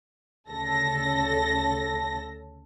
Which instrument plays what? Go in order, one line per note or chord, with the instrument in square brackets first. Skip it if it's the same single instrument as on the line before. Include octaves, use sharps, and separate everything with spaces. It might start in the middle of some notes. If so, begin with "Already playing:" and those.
[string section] D2 C#3 A4 A#6